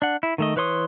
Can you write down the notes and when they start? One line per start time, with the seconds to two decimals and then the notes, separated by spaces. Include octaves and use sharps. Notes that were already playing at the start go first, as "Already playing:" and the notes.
0.02 D4 F#5
0.23 E4
0.38 D#3 A3 D#5
0.56 E3 B4 C#5 C6 D#6